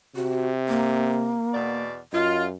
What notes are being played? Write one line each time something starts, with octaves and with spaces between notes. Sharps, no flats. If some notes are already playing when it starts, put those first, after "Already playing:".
C3 F#4
A#3
E2 B2 D5
F#2 F4 D#5